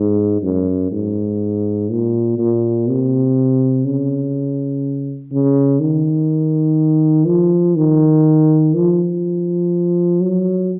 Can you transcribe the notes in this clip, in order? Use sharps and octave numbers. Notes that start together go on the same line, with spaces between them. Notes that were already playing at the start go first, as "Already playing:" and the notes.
Already playing: G#2
F#2
G#2
A#2
A#2
C3
C#3
C#3
D#3
F3
D#3
F3
F#3